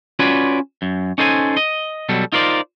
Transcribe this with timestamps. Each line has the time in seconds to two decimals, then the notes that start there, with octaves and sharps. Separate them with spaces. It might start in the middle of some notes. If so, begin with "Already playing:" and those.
0.19 C#4 F4 F#4 B4 C#5 D5
0.82 F#2
1.18 C#4 D#4 A4 C5 F#5 G#5
1.57 D#5
2.09 B2 F#3 G3 A4
2.32 D#4 F4 A#4 C5 D5